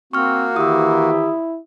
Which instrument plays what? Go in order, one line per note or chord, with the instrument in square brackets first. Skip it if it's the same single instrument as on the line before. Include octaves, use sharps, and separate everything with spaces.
[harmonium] A#3 F#4 [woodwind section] C4 [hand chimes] C#6 F6
[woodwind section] D#3 E3 G4 [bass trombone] E4 [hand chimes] D#6 E6